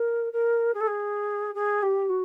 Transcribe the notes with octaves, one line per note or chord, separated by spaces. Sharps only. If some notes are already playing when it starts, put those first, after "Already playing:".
Already playing: A#4
A#4
G#4
A4
G#4
G#4
G4
F#4